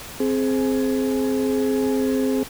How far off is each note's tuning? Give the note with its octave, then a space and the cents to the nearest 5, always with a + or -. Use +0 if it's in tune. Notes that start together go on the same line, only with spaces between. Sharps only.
C4 +0 G#4 +20